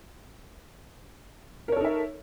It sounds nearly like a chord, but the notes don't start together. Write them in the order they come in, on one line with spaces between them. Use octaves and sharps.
A#4 C#5 A4 D#4 E5